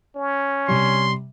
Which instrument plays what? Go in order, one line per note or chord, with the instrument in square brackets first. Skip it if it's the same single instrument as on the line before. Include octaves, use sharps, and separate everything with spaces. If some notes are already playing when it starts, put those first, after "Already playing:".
[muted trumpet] C#4
[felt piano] C3 G3 [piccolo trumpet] C6